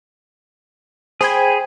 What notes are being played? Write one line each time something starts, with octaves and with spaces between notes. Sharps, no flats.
G#4 C5 G5 B5 G#6